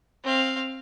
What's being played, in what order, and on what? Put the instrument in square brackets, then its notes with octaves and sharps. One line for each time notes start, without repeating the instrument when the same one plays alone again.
[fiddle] C4 F5